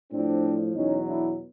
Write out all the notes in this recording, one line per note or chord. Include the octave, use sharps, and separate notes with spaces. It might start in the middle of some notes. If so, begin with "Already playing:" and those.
A2 F3 C4 D4
E2 B2 F#3 C#4 D#4
D4 E4